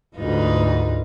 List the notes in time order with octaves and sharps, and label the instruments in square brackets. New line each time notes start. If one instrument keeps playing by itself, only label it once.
[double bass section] D2 G#2 [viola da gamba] D#4 F4 B4